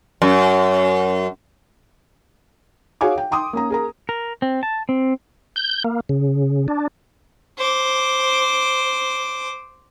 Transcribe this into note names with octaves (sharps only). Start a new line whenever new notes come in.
F#2
F#4 G#4 C#5 F5 G#5 D6
G5
G5 C6 D6 D#6
A#3 C#4 A#5
G#4 A#4 A#5
A#4
C4
A5
C4
G6
A#3
C#3
D4
C5 D6